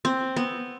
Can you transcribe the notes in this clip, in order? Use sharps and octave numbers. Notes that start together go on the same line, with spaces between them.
C4
B3